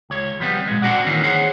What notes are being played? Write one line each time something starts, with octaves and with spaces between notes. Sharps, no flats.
C#2 C#5
F3 G3 B3 C4
A#2 G#3
C4 D4 F#4 D5 F#5
D#3 E3 A#3 C#4
G#4 C5 C#5 F#5